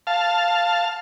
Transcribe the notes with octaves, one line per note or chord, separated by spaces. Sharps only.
F5 A5